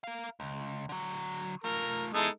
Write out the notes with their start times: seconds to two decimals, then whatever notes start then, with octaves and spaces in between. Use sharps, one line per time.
0.04 A#4 F5
0.40 C#2
0.89 D3 F#3
1.64 A3 F4 A#4
2.14 G#3 B3 D#4 E4 A4